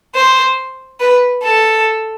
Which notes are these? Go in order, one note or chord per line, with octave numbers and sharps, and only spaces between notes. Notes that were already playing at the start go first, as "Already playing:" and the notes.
C5
B4
A4